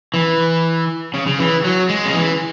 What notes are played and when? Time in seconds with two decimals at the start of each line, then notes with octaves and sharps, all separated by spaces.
0.14 E3
1.14 C#3
1.27 C#3
1.39 E3
1.64 F#3
1.89 G#3
2.05 C#3
2.13 E3